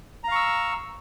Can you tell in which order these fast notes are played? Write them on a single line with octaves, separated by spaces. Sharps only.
A#5 F5 C#6 E6